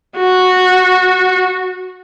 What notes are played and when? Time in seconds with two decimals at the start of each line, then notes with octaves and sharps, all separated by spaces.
0.18 F#4